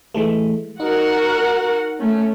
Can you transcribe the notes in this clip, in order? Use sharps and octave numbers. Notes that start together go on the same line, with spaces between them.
E3 G#3 A3
D#4 F#4 A#4 F#5
A3 C#4